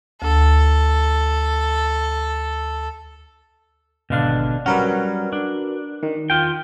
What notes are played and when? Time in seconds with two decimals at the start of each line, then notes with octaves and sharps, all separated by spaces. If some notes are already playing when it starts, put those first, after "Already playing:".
0.22 D2 A4
4.10 G#1 B2 D3 D4 F5
4.66 F#3 G3 C#4 F#4 A#4 B4
5.33 D4
6.03 D#3
6.30 F4 G5